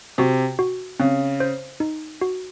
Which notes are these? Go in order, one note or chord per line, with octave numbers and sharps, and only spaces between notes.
C3 F#4
F#4
C#3 C4
C5
D#4
F#4